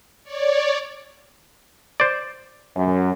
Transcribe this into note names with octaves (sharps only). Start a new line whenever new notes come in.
C#5 D5
C5 D5
F#2